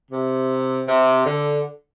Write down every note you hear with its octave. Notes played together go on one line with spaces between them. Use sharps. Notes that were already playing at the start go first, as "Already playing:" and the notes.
C3
C3
D3